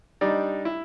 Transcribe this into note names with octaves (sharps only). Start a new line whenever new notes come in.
G3 D4 D#4
E4